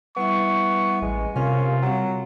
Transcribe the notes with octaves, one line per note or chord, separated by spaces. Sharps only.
G3 B3 E4 E5 C#6
A1 G#3
C3 C#4 F4 A#4 F5
F#3 G3 C4